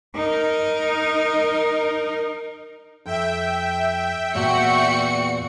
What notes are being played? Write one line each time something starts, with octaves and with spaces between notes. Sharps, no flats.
D#4 A#4
F2 E5 G5
E2 A#2 F#4 C#7